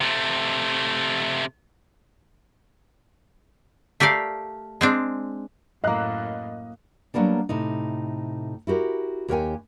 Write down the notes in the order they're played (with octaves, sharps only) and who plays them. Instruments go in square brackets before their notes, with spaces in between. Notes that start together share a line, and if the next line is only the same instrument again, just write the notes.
[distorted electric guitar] C3 A3
[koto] A3 G4 A#4 D5 F5
G#3 C4 D4
[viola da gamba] F#2 A2 [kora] A#3 F5 [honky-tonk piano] D#5 F#6
[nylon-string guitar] F#3 G3 A#3 B3 D4
A2 C3 D#4
E4 F#4 G4 A#4
D#2 G4 A#4 C#5 G5 G#5